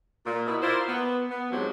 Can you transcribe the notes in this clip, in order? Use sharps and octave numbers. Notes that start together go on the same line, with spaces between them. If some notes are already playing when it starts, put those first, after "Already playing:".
A#2
B2 E4
E4 F4 A#4 C5 D5
B3
B3
F2 G#2 F3 F#3 G4